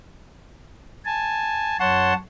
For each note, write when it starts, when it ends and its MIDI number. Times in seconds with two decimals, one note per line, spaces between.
1.05 1.77 80
1.05 1.77 81
1.80 2.13 42
1.80 2.13 73
1.80 2.14 78
1.80 2.14 81
1.80 2.13 84